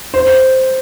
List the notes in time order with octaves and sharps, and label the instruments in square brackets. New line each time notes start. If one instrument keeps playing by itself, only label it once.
[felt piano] C5